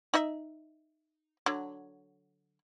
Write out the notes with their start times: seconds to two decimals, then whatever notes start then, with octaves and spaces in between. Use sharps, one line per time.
0.14 D#4 D#5 E5
1.46 D3 F#3